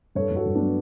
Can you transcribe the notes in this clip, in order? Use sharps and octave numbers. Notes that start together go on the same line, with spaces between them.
G2 A4 C#5
G2
F#4 A4
G2
F#3 B3 D4